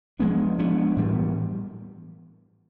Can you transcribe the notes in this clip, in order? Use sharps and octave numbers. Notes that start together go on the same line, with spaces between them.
F3 G#3 B3 D4
F3 G#3 B3 D4
A2 E3 G3 B3